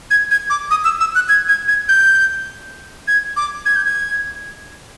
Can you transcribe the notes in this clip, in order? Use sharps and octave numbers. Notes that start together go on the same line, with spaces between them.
G#6
G#6
D6
D#6
E6
E6
F#6
G#6
G#6
G#6
G6
G#6
D6
G#6
G6
G#6